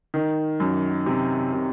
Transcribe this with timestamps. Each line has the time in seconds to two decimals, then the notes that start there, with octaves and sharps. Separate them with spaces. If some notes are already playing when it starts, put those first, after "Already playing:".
0.14 D#3
0.60 F#2
1.06 C3
1.54 C3